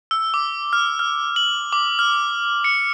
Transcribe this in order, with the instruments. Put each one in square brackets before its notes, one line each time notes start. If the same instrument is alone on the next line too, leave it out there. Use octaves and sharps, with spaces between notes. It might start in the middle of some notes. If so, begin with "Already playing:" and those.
[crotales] E6
D6
F6
F6
F#7
D6
F6
C#7